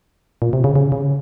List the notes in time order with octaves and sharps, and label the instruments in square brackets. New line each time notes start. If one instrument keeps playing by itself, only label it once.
[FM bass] A#2
C3
C#3
C#3
C#3